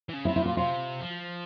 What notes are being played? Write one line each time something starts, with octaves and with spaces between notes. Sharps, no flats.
E3
C#3
E4
C3
E4
A#2 F4
C3 F4
F3